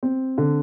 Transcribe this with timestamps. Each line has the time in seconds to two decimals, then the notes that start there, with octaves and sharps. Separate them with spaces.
0.03 C4
0.38 D3